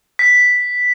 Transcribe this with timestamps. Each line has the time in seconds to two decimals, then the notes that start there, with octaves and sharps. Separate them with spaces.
0.19 B6